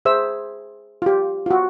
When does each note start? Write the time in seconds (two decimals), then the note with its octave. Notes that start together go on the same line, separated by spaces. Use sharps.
0.05 G#4 C5 E5 E6
1.02 F4 G4
1.46 F4 F#4